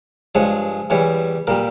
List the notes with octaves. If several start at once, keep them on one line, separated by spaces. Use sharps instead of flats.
G2 F3 G#3 C#5
E2 E3 G3 C#5
A#2 G3 A#4